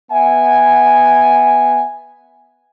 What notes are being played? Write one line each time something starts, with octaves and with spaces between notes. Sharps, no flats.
B3 E5 F#5 G#5